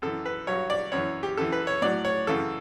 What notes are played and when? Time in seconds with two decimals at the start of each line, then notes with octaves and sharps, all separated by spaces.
0.02 F#2 E3 A4
0.26 B4
0.47 G2 F#3 C#5
0.70 D5
0.92 F#2 E3 C#5
1.23 G4
1.37 F#2 E3 A4
1.52 B4
1.67 C#5
1.82 A2 F#3 D5
2.05 C#5
2.27 F#2 C#3 E3 A4